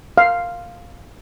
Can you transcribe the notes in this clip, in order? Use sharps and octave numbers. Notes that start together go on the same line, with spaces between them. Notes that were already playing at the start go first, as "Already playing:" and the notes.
F5